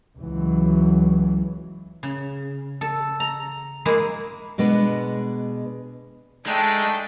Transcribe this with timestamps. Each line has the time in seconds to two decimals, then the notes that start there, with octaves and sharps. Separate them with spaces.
0.18 C#2 E3 F#3
2.03 C#3
2.81 A4
3.20 A#5
3.85 G#3 A#3 E4
4.58 B2 G#3 B3 D4 B4
6.46 G#3 A3 D4 D#4 G5 A5